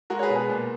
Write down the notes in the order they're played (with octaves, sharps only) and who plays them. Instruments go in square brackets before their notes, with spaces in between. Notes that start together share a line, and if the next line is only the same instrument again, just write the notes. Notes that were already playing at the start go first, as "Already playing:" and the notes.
[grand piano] G#3 F#4 A#4
C#5
G#4 B4
B2
G#4 B4
A#2